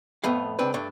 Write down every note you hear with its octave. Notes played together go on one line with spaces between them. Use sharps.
F2 A2 A3 B3 F5
C#2 C4 D4 B4
G2 A3 D4